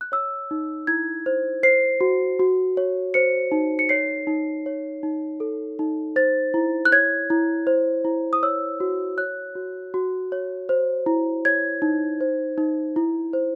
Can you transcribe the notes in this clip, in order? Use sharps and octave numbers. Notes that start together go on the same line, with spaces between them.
F#6
C#5 E6
D#4
E4 G#6
C5
C5 C7
F#4
F#4
C#5
C5 C#7
D#4
C#7
C#5 C7
D#4
C#5
D#4
A4
D#4
C5 A6
E4
F#6
C#5 G#6
E4
C5
E4
D#6
C#5 E6
F#4
C#5 F#6
F#4
F#4
C#5
C5
E4
C#5 G#6
D#4
C5
D#4
E4
C5